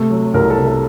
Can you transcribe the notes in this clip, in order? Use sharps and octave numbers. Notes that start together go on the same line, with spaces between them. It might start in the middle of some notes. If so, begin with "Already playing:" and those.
Already playing: C3 A3
F#3
C2 A#4
A4
C3
A4